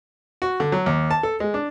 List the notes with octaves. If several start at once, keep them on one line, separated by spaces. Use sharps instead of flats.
F#4
D3
F#3
D#2
A5
A4
G#3
D4